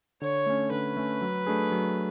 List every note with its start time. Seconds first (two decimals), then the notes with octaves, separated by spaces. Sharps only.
0.21 D3 C#5
0.46 A3 C#4
0.71 D3 B4
0.97 A3 C#4
1.21 F#3
1.47 A3 D4 G#4
1.72 F#3